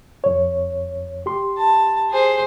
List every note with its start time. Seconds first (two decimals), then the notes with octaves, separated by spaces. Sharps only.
0.24 F2 C#5
1.26 G4 C6
1.58 A5
2.10 G#4 C5